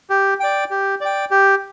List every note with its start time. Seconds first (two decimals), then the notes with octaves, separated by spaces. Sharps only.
0.10 G4
0.40 D5 G5
0.71 G4
1.01 D5 G5
1.31 G4